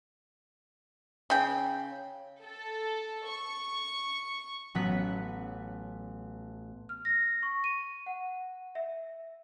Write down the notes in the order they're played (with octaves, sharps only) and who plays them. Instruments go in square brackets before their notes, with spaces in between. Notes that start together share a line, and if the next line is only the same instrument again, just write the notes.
[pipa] C#3 G5
[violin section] A4
C#6
[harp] A1 F#3 B3 B4 F#6 B6
[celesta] F6
A#6
C#6
D#7
F#5
E5